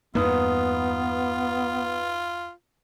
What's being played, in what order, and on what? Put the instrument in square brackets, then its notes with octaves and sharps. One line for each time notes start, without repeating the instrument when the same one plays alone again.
[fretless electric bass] E2 G2 A#3 [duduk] B3 [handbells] D#4 B4 D#6 [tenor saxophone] F4